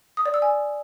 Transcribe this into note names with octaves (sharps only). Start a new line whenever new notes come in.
D#6
D5
E6
G#5